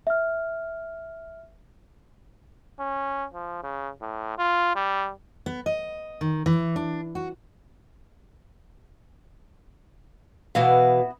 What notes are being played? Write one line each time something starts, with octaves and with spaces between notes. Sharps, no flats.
E5 F6
C#4
F3
C#3
A2
F4
G3
B3
D#5
D#3
E3
D4
F#4
B2 E3 B3 E4 F#4 F5